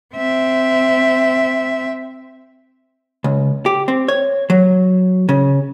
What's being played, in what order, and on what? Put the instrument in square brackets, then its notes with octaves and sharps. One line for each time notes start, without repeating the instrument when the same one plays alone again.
[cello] C4 E5
[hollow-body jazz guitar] C#2
G4
C4
C#5
F#3
C#3